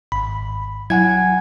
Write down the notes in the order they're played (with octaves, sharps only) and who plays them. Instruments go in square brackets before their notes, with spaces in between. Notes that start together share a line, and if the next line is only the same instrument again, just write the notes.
[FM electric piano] G#1 [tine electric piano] B5
[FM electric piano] F#3 E4 F#4 [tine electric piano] F#5 G#5 G#6